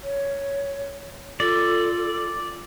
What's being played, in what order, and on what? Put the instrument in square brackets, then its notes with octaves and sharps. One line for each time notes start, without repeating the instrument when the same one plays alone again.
[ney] C#5
[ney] F4 [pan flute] A4 [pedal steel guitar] D5